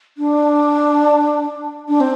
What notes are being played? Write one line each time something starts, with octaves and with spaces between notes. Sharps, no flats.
D4
D4
C4